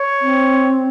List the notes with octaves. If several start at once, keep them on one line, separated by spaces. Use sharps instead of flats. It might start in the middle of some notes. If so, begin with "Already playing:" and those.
Already playing: C#5
C4